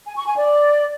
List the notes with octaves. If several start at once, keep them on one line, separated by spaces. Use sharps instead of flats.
G#5
C#6
G#5
D5